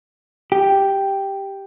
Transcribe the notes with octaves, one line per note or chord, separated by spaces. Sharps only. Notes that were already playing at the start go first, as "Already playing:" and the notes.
G4